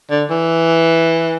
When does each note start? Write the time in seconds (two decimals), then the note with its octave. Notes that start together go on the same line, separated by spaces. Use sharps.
0.10 D3
0.30 E3